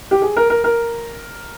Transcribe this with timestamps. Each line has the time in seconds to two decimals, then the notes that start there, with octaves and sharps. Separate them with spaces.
0.11 G4
0.22 G#4
0.37 A#4
0.50 A#4
0.64 A#4